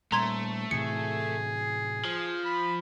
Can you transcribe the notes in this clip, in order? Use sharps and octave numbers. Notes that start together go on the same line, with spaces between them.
A#2 G3 A3 A#5 C6 G#6
A2 C3 E3 G#4 C#7
F3
B5